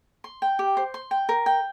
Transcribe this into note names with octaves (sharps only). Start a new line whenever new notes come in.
C6
G5
G4
C5
C6
G5
A#4
G5